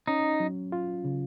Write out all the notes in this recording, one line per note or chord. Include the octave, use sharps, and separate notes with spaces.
C#4 D#4
F#3
F4
C#3